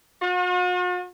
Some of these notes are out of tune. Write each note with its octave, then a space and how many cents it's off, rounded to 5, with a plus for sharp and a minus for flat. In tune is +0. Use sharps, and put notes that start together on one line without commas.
F#4 -45